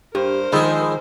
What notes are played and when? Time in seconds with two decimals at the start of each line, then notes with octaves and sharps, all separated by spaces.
0.15 G2 G4 A#4 C5
0.52 D#3 F3 G#3 G#4 B5 D#6 E6